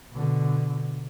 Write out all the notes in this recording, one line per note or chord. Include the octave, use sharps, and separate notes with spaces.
B2 D3